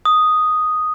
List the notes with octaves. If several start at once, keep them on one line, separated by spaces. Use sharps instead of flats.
D#6